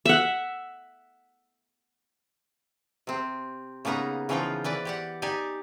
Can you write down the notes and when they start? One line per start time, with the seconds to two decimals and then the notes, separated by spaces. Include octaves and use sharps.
0.05 E5 F#5
3.07 C3 C4
3.85 C#3 A#3 B3 D#4 A#5
4.29 C#3 E3 F3 D#4 F4 G5
4.64 E3 B4 D5
4.85 G4 D5 F#5
5.22 D#4 G4 D5 G#5